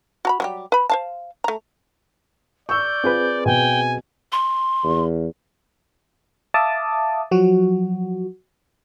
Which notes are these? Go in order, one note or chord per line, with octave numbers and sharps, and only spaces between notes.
F#4 A#5 B5
F#3 G3 G4
B4 B5
C5 F5 A5
A3 A#5
D5 C#6 E6 G6
C4 F4 G#4 B4
B2 G5 G#5
C6
E2
E5 F5 A5 D6 D#6
F3 F#3 F#4